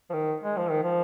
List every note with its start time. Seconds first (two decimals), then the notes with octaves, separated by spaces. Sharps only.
0.10 F3
0.13 D#3
0.43 G#3
0.57 F3
0.70 D#3
0.83 F3